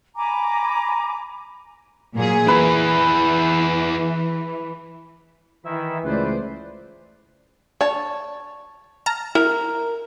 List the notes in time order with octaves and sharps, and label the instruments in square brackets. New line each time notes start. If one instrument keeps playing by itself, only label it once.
[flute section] G#5 A#5 B5 D6
[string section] A#2 F#3 G#4
[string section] E3 [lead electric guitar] E4 G#4 [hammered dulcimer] B4
[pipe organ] D#3 E4 E5 [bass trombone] E3
[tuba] C#2 [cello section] A3 C5 D5 [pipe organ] B4
[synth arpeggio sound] D4 [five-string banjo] C#5 A5
[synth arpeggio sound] A5 A#5 F6
[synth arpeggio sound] E4 [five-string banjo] A#4